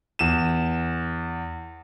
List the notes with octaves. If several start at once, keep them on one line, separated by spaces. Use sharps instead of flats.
E2 E7